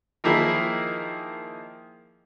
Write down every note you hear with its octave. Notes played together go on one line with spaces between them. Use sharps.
D#3 F3 A#3 E4 G#4 A#4